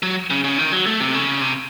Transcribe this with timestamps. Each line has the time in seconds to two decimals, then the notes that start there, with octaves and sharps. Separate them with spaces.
0.03 F#3
0.30 C#3
0.44 C#3
0.58 D#3
0.72 F#3
0.86 A3
1.00 C3
1.14 C#3
1.41 C3